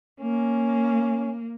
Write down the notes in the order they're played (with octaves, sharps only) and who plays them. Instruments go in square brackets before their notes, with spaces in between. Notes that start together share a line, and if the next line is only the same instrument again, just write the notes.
[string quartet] A#3 [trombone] C#4